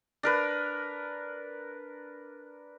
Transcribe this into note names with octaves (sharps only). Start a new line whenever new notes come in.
D4 A#4 B4